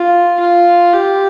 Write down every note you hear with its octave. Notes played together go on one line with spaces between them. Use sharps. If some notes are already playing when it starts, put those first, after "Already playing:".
Already playing: F4
F4
G4